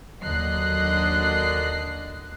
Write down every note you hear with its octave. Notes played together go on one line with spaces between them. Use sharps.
D#2 D3 F#3 D#5 F#6 C7